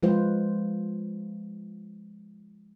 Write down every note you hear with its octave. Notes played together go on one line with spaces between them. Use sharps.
F3 G#3 F4 B4 C5